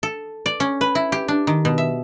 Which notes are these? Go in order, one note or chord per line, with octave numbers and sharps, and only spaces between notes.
A4
D5
C#4
B4
E4
G4
D4
D#3
B2
E5